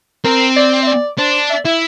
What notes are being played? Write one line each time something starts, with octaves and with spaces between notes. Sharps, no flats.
C4 A#4
D5
E5
D5
D4 C5
E5
E4 E5